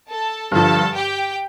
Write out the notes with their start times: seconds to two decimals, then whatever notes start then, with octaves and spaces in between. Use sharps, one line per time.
0.09 A4 A5
0.51 G2 D3 F3 A4 A5
0.94 G4 G5